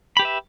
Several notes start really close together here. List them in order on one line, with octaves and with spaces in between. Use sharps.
B5 G4 B4 E5